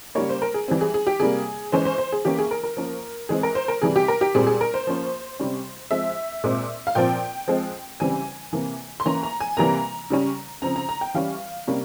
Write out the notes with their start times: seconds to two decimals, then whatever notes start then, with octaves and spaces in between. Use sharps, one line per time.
0.15 C#3 G3 A#3 C#5
0.29 C5
0.42 A#4
0.54 G#4
0.68 E3 G3 C4
0.81 G#4
0.94 G#4
1.07 G4
1.20 C3 G3 A#3 G#4
1.72 E3 G#3 C#4 C5
1.85 C5
1.98 C5
2.12 G#4
2.25 E3 A#3 C#4 G4
2.39 G#4
2.51 A#4
2.64 A#4
2.77 F3 A#3 C#4
3.29 E3 G#3 C4 G#4
3.43 A#4
3.55 C5
3.68 A#4
3.82 C3 E3 G3 G#4
3.96 G4
4.08 A#4
4.21 G4
4.35 A#2 G3 C4 G#4
4.47 G#4
4.61 A#4
4.74 C5
4.87 F3 A#3 C#4
5.39 C3 G3 C#4
5.91 F3 G#3 C4 E5
6.44 A#2 G#3 C4
6.87 F5
6.95 A#2 F3 C4 G5
7.48 F3 G#3 C4
8.00 C#3 E3 G3 C4 G#5
8.53 C3 E3 A#3
9.00 C6
9.05 E3 A#3 C#4 A#5
9.23 A#5
9.40 G#5
9.57 C3 E3 G3 A#3 A#5
10.10 C#3 G3 C#4
10.62 C#3 F3 C4 A#5
10.76 A#5
10.89 A#5
11.01 G5
11.14 E3 G3 C#4 F5
11.67 C3 G3 A#3 C#4